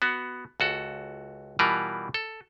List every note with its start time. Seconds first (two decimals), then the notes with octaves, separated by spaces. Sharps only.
0.02 B3 F#4
0.60 C#2 F#4 A4
1.59 B2 E3 G3 F4 A#4 B4
2.14 A4